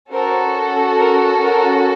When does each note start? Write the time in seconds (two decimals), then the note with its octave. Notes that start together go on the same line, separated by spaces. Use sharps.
0.12 C#4 F#4 A4 A#4 C5
0.99 A#4
1.42 A#4